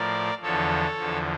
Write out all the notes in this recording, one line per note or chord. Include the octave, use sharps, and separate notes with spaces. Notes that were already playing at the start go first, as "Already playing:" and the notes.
Already playing: A2 F3 A#4 D5
E2 D3 F3 A4 C#5
E2 D3 F3